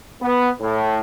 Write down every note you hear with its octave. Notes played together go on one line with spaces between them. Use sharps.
B3
A2